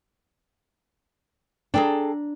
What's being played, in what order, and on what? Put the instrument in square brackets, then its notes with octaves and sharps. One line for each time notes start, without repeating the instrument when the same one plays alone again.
[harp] D4 A#5 [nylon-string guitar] G#4 A4 G5